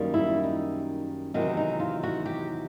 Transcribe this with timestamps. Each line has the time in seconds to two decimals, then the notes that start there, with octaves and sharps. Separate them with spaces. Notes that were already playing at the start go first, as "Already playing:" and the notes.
Already playing: F#2 D#3 G3 A#3
0.14 E4
0.44 D#4
1.34 E2 C3 D#3 F#3 D#4
1.57 D#4
1.80 F4
2.03 F#4
2.26 G4